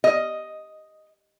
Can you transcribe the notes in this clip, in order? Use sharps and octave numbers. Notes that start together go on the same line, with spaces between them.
D#5